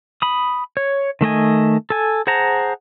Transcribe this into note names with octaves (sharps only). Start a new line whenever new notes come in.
B5 D#6
C#5
D#3 A3 D#5 G#5
A4 G#5
G#4 C5 F#5 A5 A#5